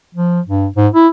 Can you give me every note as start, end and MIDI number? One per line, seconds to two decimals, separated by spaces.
0.15 0.40 53
0.47 0.67 43
0.76 0.88 44
0.94 1.08 64